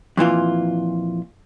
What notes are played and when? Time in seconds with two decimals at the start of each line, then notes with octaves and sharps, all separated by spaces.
0.17 F2 A#2 E3 F4